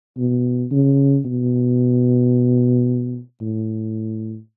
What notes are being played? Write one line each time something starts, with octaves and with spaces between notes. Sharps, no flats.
B2
C#3
B2
A2